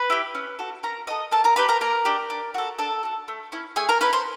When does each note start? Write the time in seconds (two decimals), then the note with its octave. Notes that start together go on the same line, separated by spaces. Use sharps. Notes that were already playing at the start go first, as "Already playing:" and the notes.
Already playing: B4 B5
0.10 E4 G4
0.35 C#4
0.59 F#4 A4
0.83 C#4 A#4 A#5
1.07 F#4 A4 D#5 D#6
1.31 A#3 A4 A5
1.44 A#4 A#5
1.56 D4 G4 B4 B5
1.69 A#4 A#5
1.81 A#3 A#4 A#5
2.05 D4 G4
2.30 D4
2.54 F#4 A4
2.78 D4 A4 A5
3.03 F#4 A4
3.28 A3
3.52 C#4 E4
3.76 A3 G#4 G#5
3.89 A#4 A#5
4.01 C#4 E4 B4 B5
4.13 C5 C6